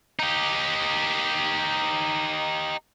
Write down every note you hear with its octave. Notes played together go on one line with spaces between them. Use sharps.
D#4 G4